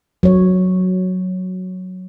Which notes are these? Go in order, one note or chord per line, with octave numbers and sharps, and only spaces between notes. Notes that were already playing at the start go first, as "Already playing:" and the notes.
F#3 C#5